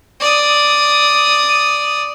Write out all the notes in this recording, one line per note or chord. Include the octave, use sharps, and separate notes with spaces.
D5 D#6